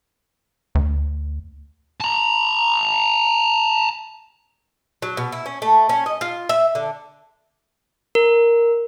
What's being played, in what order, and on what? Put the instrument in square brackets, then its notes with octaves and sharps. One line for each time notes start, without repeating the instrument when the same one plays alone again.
[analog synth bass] D2
[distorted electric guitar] A5 A#5
[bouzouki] F#3
B2
E4
C#4
A3
C#4
D#5
F4
E5
D3
[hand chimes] A#4